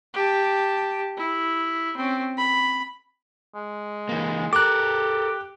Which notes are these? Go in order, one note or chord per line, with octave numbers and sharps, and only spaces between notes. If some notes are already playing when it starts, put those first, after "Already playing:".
G4 A5
E4
C4 C#4
B5
G#3
E3 A#3
G4 A4 A#4 D6 F#6